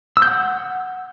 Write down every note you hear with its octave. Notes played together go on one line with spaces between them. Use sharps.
E6
G6
F#5